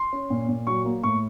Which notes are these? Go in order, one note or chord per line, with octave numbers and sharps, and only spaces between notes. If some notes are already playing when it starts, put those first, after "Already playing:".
Already playing: C6
C#4
A#2
A#2
F#3 C#6
A#3
A2 C#6